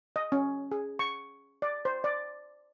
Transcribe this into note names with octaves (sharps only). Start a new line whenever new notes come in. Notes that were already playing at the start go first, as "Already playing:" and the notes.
D#5
C#4
G#4
C#6
D5
C5
D5